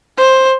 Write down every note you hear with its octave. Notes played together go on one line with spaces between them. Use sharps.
C5